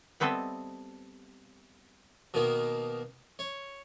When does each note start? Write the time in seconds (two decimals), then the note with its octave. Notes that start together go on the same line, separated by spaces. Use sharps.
0.20 G3 B3 C4 A4 D#5 E5
2.34 B2 D#3 A#3
3.39 C#5